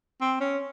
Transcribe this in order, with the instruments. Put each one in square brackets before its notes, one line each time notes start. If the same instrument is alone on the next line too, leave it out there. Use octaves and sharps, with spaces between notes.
[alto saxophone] C4
C#4